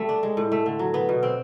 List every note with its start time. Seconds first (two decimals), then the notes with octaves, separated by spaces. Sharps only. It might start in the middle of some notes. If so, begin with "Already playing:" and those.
Already playing: G3 A3
0.09 D4
0.23 G#3
0.37 A2
0.52 A3
0.66 D3
0.79 F#3
0.94 B3
1.09 B2
1.23 C4